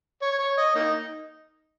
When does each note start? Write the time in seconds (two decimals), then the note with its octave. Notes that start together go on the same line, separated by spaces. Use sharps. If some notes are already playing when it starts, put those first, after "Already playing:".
0.22 C#5
0.39 C#5
0.57 D#5
0.75 A#3 D#4